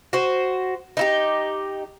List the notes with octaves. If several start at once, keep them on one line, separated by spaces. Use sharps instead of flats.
F#4 C5
D#4 E4 G4